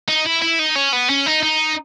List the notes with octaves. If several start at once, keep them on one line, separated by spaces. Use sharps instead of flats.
D#4
E4
E4
D#4
C#4
B3
C#4
D#4
D#4